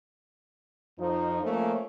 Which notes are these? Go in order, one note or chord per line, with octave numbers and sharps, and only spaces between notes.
F2 F3 D#4
F3 A3 A#3 C#4